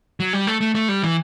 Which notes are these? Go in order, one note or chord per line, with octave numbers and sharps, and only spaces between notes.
F#3
G3
A3
A3
A3
G3
E3